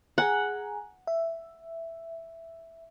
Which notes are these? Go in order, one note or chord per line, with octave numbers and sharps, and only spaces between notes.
G#4 F#5 G#5 A#5
E5